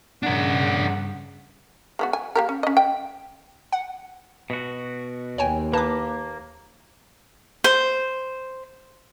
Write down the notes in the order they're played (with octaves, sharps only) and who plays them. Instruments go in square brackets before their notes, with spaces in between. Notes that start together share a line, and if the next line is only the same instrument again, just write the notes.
[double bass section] G2 C#3 [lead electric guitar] D4 A#4 [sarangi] F#5
[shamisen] G#3 B3 F#4
G#5
A#3 G4 A#4
C#4
C#4 D#5
G5
[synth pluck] F#5
[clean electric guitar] B2 F#4
[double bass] D#2 [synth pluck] C#5 G5 G#5
[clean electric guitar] A#3 [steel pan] B4 [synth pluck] A5 D6
[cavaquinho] C5